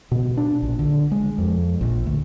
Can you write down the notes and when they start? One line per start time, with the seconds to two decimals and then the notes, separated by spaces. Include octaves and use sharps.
0.11 B2
0.37 D4
0.62 A#1
0.79 D3
1.11 G#3
1.38 F2
1.81 A#1
2.06 D2